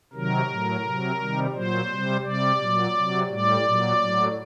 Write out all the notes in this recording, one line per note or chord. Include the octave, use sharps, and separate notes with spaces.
C3 D#3 F#3 A#4
A2 F#3
C3 F#3
C3 D#3 G3
A#2 F#3 C5
C3 G3
C3 G3 D5
A#2 F#3
C3 F#3
A2 G3 D5
A#2 F#3
A2 F#3